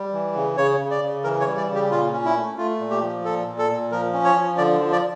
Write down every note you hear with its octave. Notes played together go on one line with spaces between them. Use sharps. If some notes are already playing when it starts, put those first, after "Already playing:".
Already playing: G3
E3
C#3
C#3 C#5
C#3
D5
C#3
E3 A#4
C#5
G3
D5
C#3
G4
A#2 F4
C#4
E4
A3
A3 F4
A#2
G4
F3
A#2 A4
A#2
A4
A#2
F3 A#4
C#4
C#5
F3
D3 D5
F3
D5